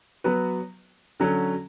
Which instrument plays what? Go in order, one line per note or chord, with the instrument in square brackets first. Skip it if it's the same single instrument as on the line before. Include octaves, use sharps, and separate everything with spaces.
[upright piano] F#3 B3 F#4 B4
D3 F#3 C#4